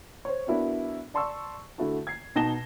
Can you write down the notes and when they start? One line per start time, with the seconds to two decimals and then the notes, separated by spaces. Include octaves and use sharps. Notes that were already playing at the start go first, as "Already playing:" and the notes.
0.25 C5 C#5
0.47 B3 D4 E4 F#4 A#4
1.14 D5 A5 C6 C#6 E6
1.78 D3 A3 E4 F#4 A4
2.07 G#6 C7
2.36 B2 D#4 A5 A#6 E7 G7